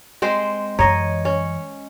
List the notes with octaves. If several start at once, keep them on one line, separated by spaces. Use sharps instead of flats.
G#3 C4 C5
F#2 E3 C#5 D#5 A#5
C#4